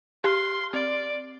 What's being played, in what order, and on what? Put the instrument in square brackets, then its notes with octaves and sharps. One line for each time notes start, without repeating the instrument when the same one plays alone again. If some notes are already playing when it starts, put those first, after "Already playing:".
[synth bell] G4 F6 [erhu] C6
[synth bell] C4 [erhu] D5